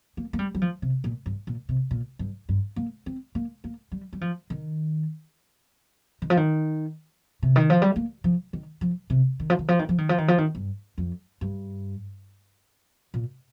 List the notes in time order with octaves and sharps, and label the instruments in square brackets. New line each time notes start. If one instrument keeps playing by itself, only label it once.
[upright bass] A#3
A#3
G3
G3
F3
C3
A#2
G2
A#2
C3
A#2
G2
G2
A#3
C4
A#3
A#3
G3
G3
F3
D#3
D#3
F3
D#3
C3
D#3
F3
G3
A#3
F3
D#3
F3
C3
D#3
F3
D#3
F3
D#3
F3
D#3
F3
D#3
F3
D#3
G2
F2
G2
A#2